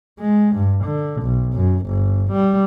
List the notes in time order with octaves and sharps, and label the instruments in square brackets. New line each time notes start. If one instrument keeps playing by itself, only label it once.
[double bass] G#3
G2
D3
B1
F#2
G1
G3